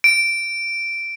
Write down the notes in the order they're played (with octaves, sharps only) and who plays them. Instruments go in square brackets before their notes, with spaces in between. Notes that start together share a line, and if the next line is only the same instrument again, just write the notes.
[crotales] D7